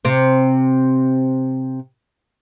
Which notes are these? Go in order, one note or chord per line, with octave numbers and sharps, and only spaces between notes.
C3 C4